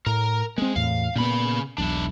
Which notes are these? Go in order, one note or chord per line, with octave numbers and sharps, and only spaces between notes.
A2 A#4 A#5
G#3 A#3 C4
E2 A2 F5
A#2 C#3 B3 B5
E1 B1 D4 E4